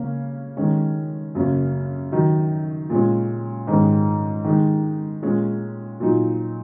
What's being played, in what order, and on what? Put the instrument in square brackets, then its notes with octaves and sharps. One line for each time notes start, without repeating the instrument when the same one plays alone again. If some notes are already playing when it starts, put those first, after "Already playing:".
Already playing: [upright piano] C#3 A#3 C#4
D#3 G#3 C#4
F#2 C#3 A#3 C#4
D#3 F#3 D#4
A#2 G#3 C#4
G#2 D#3 G#3 C#4
D#3 G#3 D#4
A#2 G#3 C#4
A#2 F#3 D#4